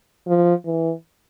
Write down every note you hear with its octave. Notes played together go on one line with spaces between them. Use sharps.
F3
E3